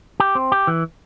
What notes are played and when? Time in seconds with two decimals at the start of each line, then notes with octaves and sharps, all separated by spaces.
0.20 G4
0.35 C4
0.52 G4
0.67 E3